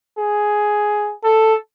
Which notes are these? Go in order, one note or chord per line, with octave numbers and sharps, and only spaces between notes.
G#4
A4